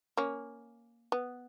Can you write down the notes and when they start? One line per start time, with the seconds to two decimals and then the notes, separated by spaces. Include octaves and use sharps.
0.17 A#3 C#4
1.12 B3